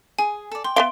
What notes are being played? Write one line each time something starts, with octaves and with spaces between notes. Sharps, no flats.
G#4 G#5
A4 D5
G5 C6
B3 E5 F5 C6 D7 G7